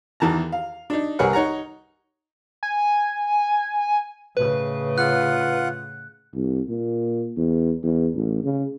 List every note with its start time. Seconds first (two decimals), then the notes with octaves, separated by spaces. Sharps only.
0.20 E2 D#3 E3 A5 A#5
0.52 F5
0.90 D4 D#4
1.19 C2 G#4 A#4 B4 C#5 F#5
1.33 D#4 C#5 F#5 A#5
2.63 G#5
4.37 A2 C#3 B4
4.98 F4 F#5 F#6
6.34 C2
6.69 A#2
7.37 E2
7.83 E2
8.14 A1
8.44 C#3